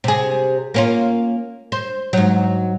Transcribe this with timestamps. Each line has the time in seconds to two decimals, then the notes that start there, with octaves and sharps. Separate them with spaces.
0.04 C3 G#4
0.74 A#3 C#4 F4
1.72 C5
2.13 G#2 F#3